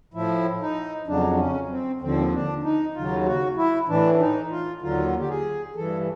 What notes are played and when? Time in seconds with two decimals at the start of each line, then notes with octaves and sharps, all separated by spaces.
0.14 A2 F3 E4
0.61 D#4
1.07 F2 C#3 F#3 D4
1.38 C#4
1.70 C4
2.01 D#2 D3 F3 C4
2.32 D4
2.63 D#4
2.94 D#2 C#3 F#3 F4
3.26 F#4
3.57 E4
3.88 A2 E3 D4
4.20 D#4
4.51 F4
4.82 D#2 D3 F#3 F4
5.19 G4
5.29 G#4
5.76 G2 E3 A4